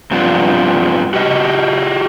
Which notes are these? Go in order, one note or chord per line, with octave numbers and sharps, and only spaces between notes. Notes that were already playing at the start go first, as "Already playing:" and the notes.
G2 C3 F3 B3 D4 F4
F#4 G4 D#5